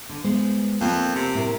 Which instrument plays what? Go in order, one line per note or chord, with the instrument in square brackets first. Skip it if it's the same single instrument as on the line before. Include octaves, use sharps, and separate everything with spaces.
[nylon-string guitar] D3
G#3 B3 C5
[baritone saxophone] F2 [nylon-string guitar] A#3
[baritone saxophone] C3
[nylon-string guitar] A2 A#4